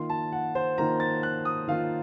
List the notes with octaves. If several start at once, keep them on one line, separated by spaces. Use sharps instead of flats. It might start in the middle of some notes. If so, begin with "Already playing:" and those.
Already playing: D#3 A#3 F4 C6
A5
F#5
C5
D#3 A#3 F4 A#5
A6
F#6
D#6
D#3 A#3 F4 F5